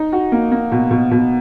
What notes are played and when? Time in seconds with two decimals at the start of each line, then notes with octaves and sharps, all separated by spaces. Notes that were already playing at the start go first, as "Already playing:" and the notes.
Already playing: D#4
0.12 F#4
0.32 A#3
0.52 A#3
0.72 B2
0.91 B2
1.11 B2